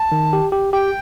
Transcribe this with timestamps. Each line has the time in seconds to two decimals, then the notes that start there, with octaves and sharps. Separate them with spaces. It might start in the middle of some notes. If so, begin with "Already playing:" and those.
Already playing: A5
0.12 D#3
0.33 G4
0.52 G4
0.73 G4 G5